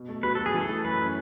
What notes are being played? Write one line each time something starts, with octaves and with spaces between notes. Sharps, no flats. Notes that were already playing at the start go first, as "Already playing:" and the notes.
Already playing: B2
A3
F#3 B4
F#3 A4
G#4
E3 A4
A3
F#2 B4
C#4